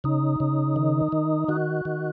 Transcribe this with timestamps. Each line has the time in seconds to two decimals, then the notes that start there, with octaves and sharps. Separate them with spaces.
0.04 C#3 D#4
0.40 C#3
0.76 D#3
1.12 D#3
1.48 D#3 F#4
1.85 D#3